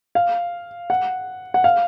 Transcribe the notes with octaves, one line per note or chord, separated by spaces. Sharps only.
F5
F#5
F#5
F5